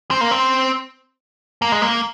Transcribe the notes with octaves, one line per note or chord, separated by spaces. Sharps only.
C4
A#3
C4
A#3
G#3
A#3